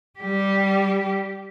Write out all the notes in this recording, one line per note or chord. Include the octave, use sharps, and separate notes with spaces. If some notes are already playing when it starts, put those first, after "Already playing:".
G3 G4